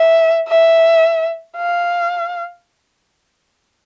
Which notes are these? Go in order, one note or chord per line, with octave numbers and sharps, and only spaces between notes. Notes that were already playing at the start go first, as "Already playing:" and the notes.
Already playing: E5
E5
F5